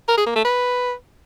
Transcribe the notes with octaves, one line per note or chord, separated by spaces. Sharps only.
A#4
G#4
A#3
A3
B4